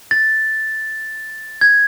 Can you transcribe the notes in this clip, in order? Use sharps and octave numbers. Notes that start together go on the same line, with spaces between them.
A6
G#6